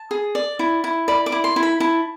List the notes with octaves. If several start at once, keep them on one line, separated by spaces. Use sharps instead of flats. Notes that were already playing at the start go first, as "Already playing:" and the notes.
Already playing: A5
G#4
D5
E4
E4
D5 B5
D6
E4
C6
E4
B5
E4 A5